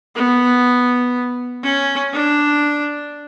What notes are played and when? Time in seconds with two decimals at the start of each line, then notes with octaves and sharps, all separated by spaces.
0.16 B3
1.63 C#4
2.13 D4